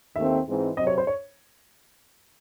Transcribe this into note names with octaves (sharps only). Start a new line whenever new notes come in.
D#2 D#3 A3 C4 E5
G#2 E3 G#3 C4
C3 F#3 C4 D#5
C#5
C5
C#5